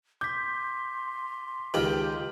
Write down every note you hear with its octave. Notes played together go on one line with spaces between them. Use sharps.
C6 D6 G6 B6
C#2 D#3 F4 G4 G5 F6 F#7